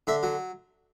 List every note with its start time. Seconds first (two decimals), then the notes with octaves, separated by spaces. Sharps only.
0.07 D3 E5
0.23 F#3